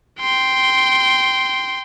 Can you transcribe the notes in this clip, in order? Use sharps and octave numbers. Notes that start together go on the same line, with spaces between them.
G5 C6